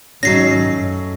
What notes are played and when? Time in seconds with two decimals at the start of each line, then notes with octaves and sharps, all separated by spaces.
0.23 G#1 F#3 A3 C#4 D#4 A#6 C7
0.68 F#2